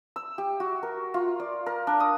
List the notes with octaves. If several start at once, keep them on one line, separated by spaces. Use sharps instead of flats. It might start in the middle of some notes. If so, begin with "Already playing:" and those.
E6
G4
F#4
A#4
F4
D5
A#4
D4
D#6